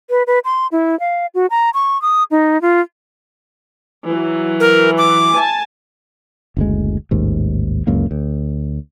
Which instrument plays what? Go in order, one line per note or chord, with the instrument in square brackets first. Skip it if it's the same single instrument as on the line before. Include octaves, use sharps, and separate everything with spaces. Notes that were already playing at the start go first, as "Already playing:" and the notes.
[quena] B4
B4
C6
E4
F5
F#4
A#5
C#6
D#6
D#4
F4
[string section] E3 F#3
[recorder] A#4
D6
[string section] G#5 A5
[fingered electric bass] F#1 D2 G#3
A1 D#2 G#2
D1 C#2 F#2 A#3
D2